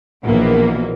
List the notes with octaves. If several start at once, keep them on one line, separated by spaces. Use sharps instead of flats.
A#1 B2 E3 A#3